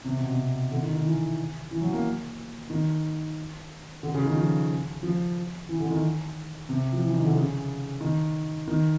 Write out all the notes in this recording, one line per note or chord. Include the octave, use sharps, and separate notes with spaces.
C3
B2
C3
D3
D#3
D#3
E3
E3
F#3
A#3
D#3
D3
C#3
D#3
F3
F3
E3
D3
D#3
C3
F3
E3
D#3
D3
C#3
D#3
D#3